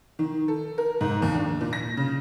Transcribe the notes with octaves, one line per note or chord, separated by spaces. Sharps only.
D#3
A4
A#4
G#2
D#2
D4
A#2
A#6
C#3